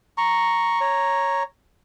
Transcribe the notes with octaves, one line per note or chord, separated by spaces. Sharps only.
A#5 C#6
C#5 A#5